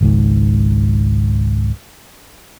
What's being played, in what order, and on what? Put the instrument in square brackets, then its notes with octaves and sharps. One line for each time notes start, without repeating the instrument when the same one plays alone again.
[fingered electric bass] G#1 C#2 G#2